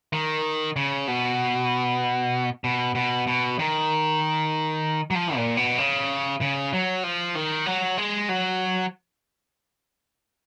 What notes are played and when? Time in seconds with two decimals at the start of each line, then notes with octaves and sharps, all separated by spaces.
0.13 D#3
0.76 C#3
1.08 B2
2.64 B2
2.95 B2
3.27 B2
3.59 D#3
5.11 F#3
5.15 F3
5.36 A#2
5.57 B2
5.78 C#3
6.41 C#3
6.73 F#3
7.03 F3
7.35 D#3
7.66 F#3
7.98 G#3
8.29 F#3